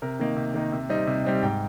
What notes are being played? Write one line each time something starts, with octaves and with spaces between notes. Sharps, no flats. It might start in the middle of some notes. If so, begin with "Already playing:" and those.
C3 A#4
D#3 A#3 D#4
C3
D#3 A#3 D#4
C3
G3 C4 D#4
C3
G3 C4 D#4
G#2 G5